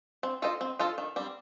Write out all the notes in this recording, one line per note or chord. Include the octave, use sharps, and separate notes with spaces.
C4
F4 A4 C5 D#5
C4
F4 A4 C5 D#5
D#3
G3 C4